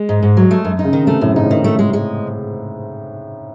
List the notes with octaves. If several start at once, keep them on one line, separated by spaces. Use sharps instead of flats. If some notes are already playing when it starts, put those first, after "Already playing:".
Already playing: G#3
G#2
G#2
F#3
A3
F#2
D#4
C#3
D#3
C3 A3
F#2 A2
G#2 D#4
A2 D#3
A3
G#3
G#3